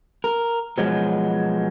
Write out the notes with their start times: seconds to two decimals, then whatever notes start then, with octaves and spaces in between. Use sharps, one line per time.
0.24 A#4
0.78 B2 F3 F#3 G#3